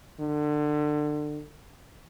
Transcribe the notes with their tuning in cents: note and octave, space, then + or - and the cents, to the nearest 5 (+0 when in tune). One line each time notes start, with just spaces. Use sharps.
D3 +25